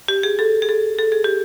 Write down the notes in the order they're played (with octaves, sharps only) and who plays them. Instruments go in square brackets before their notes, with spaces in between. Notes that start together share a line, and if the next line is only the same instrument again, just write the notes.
[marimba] G4
G#4
A4
G#4
A4
A4
G#4
G4